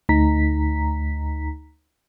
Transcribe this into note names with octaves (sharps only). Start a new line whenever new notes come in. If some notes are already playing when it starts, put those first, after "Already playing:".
D2 A3 D#4 A#5 B6